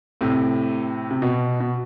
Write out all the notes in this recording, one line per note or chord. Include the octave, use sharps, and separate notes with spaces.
A2 C3
C3
B2
B2